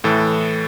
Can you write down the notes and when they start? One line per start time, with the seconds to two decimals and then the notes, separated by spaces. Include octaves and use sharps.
0.04 A2 E3 A4